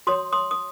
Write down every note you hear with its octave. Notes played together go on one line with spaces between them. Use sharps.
F#4 C#5 C6 D#6
C6 D#6
D#6